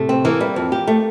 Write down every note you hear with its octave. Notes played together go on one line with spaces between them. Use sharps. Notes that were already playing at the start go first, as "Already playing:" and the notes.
Already playing: A2 C3 A3
C4
E3 A#3
G3
F2
G4
A3